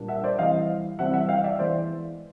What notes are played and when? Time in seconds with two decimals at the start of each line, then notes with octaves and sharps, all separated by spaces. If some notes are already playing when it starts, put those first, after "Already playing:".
Already playing: A#2 G3 A#3 D4 F4
0.08 E5 F#5
0.24 C5 D5
0.38 C3 E3 G3 C4 D#5 F5
0.99 C3 E3 G3 C4 E5 F#5
1.13 E5 F#5
1.29 F5 G5
1.44 D5 E5
1.59 E3 G#3 B3 C5 D5